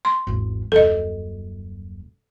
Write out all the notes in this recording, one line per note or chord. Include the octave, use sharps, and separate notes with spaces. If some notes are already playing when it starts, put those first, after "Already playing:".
C6
G#1 E2
D#1 F#2 A4 D#5